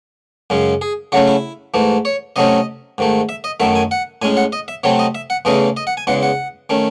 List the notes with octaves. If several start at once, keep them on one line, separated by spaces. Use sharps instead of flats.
F#2 C#3 G#3 C#4
G#4
C#3 F#3 A3 C#4 F#4
E4
G#2 E3 A3
C#5
C3 F#3 A3 C#4 D#5
G#2 D#3 A3
E5
D#5
F#2 D#3 F#3 A3 E5
G#5
F#5
A2 G#3 C#4 G#5
F#5
D#5
E5
C3 F#3 A3 C4 C#5
D#5
E5
F#5
E2 C#3 E3 A3 C#4 D#5
D#5
F#5
G#5
E2 C#3 G#3 F#5
F#5
D#3 A3 C#4